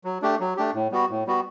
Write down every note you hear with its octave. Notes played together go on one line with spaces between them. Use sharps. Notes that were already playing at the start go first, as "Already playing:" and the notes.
F#3
A3 D4 G4
F#3
A3 D4 G4
A2
G3 B3 F#4
A2
G3 B3 F#4